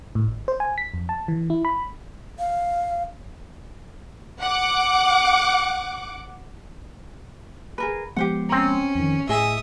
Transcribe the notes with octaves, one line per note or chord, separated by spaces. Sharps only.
A2
G#1
C5
G#5
B6
F2
A5
E3
E4
B5
F5
F#5 D6
G#4 A#4 B4
F3 G#3 B3 G4 C5 F#5
C4 C#4 A#5
F2 D#3
A2 G#4 D#5 E5 G#5 D#6